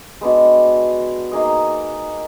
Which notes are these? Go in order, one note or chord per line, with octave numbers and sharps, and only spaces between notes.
G#3 B3 D4 F#4
A#3 D#4 G#4 D#5